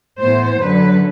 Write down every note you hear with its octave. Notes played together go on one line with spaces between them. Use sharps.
A2 E3 B3 C5
F#2 D3 F#3 B4